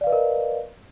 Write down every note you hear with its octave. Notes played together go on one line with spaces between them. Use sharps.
A#4 B4 D5 D#5 F5